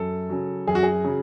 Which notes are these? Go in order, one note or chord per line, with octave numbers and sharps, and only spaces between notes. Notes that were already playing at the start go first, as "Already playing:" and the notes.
Already playing: F#2 A4
C#3 F#3
F#2 G#4
F#4
G#4
C#3 F#3